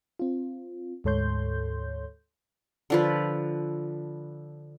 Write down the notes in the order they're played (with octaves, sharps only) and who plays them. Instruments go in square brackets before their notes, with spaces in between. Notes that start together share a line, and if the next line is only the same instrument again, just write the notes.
[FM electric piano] C4 F4
D2 G#2 A4 C#5 C6 G6
[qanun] D3 F3 B4